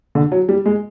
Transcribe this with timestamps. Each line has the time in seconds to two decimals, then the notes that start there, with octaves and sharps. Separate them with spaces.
0.15 D3
0.32 F#3
0.49 G3
0.66 G#3